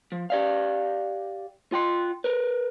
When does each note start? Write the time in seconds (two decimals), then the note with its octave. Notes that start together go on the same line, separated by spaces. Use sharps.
0.12 F3
0.30 G4 D5 F5
1.72 F4 G5 C6
2.24 A#4 B4